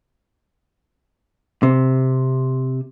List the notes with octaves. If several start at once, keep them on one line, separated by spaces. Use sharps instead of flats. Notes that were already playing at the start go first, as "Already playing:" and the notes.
C3